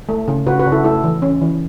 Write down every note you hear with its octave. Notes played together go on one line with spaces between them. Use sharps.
A3
C#3
C#3 F#4 B4
F#4 B4
C#3
E4 A4
A3 E4 A4
E3
C#4
E3